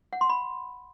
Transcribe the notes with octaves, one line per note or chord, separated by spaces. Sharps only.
F#5
C6
B5